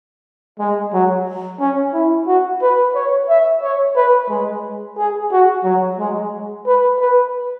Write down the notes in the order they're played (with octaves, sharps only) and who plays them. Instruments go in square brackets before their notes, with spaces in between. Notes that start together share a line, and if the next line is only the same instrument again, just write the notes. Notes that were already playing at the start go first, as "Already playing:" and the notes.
[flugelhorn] G#3
F#3
C#4
E4
F#4
B4
C#5
E5
C#5
B4
G#3
G#4
F#4
F#3
G#3
B4
B4